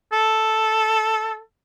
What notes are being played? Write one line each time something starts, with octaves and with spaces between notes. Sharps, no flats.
A4